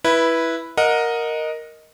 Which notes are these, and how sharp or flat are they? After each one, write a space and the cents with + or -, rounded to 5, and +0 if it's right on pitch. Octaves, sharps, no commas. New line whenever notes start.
E4 +0 B4 -10
A#4 +0 D#5 +0 F#5 -25